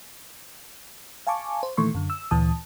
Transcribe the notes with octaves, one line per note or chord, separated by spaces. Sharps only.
F5 G#5 A5 C#6 D6
C5
A#2 D#3 E3 A3 C6 C#6
F#2 D3
E6
D2 A#2 E3 A5 D#6